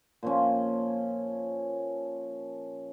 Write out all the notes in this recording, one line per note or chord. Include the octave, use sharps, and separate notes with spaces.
A#2 F3 C#4